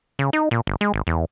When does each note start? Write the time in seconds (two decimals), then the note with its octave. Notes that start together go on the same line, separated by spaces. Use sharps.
0.19 C#3
0.33 D#4
0.51 A#2
0.67 G1
0.81 G#3
0.94 G#1
1.07 E2